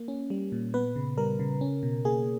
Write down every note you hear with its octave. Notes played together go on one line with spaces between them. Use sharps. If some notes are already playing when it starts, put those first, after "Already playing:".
Already playing: A#3
C#4
G3
A#2
B3 B4
C#3
G3 A#4
C#3
C#4
B2
A#3 G#4